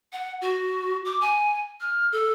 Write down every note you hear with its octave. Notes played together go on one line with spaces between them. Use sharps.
F#5
F#4
D6
G#5
F6
A4